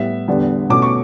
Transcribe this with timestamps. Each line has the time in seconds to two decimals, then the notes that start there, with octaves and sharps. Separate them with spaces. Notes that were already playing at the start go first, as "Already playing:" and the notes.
Already playing: A2 G3 B3 E5
0.28 E2 D3 G3 B3
0.69 B2 A3 C#4 D6
0.82 C#6